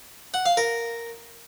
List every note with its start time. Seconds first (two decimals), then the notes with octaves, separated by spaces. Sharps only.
0.34 F#5
0.46 F5
0.57 A#4